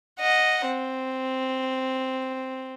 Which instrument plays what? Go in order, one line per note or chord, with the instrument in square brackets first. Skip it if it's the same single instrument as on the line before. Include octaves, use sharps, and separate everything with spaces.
[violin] D#5 F#5
C4